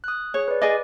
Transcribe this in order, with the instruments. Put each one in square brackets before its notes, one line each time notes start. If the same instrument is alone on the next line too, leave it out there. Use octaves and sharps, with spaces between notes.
[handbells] D#6 F#6
[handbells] G#4 [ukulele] C#5
[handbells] B4 D5
[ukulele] G#4 D5 D#5 [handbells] D6